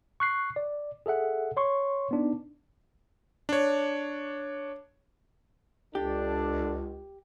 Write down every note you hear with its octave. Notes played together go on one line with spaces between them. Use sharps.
C#6 F#6 C7
D5
G#4 A4 E5 F#5
C#5 C6 C#6
B3 D4 D#4
D4 C#5
C#2 D4 G4 A4